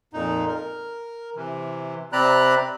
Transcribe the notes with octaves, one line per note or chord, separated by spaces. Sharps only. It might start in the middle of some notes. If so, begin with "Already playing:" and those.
F2 A#2 D#4
A#4
C3 E3
C3 C4 D5 A#5 B5 F#6